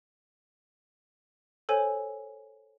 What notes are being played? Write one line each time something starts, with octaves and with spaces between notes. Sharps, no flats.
A4 C5 C#5 G#5